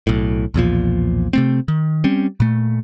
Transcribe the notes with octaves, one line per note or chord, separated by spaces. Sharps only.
B1 A2
B1 E2 A#2 F3
C3 A3 C4
D#3
G3 C4 C#4
A#2 A3